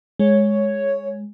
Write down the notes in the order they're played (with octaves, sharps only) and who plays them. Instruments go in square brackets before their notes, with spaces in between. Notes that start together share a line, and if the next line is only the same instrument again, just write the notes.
[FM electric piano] G#3 [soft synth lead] C#5